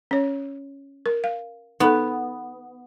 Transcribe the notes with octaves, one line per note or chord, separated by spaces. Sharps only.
C#4 C#5
A#4
F5
B3 D#4 A4